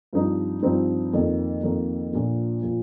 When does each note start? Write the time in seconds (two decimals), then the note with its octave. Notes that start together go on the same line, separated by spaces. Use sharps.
0.13 G2 F3 C4 D#4
0.62 G2 F3 C4 D#4
1.13 F2 D#3 A#3
1.63 F2 D#3 A#3
2.13 A#1 A#2 F3
2.62 A#2 F3